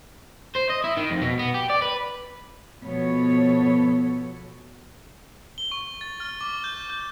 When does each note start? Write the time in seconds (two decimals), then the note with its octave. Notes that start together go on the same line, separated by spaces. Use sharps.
0.56 C5
0.70 D#5
0.84 E4
0.97 D#3
1.10 F2
1.22 B2
1.39 B3
1.54 G4
1.70 D5
1.82 B4
2.85 B2 F3 B3 A4 C#5
5.58 G7
5.72 C#6
6.01 A6
6.20 F6
6.41 D6
6.64 G6
6.90 G6